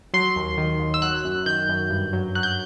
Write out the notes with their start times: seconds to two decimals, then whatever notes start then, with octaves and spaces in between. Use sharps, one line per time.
0.14 F#3 C6
0.36 D#2
0.58 D#3
0.80 D#2
0.94 E6
1.02 F#3 F#6
1.25 F#2
1.46 D#3 G6
1.69 F#2
1.90 G2
2.13 F#3
2.35 F#3 F#6
2.43 G6